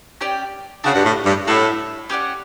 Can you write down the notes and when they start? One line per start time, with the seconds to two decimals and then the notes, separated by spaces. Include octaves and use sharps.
0.21 C#4 G4 D5 G5
0.84 C#3 D4 F#4 C#5 F#5
0.95 G2
1.05 A2
1.26 G2
1.47 A2 F#4 A4 E5
2.10 C#4 G4 D5 F#5